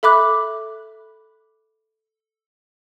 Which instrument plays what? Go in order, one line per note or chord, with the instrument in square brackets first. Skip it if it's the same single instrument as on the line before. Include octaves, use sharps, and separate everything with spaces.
[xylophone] A4 E5 B5 D6 F#6